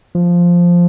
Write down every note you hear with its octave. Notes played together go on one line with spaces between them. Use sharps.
F3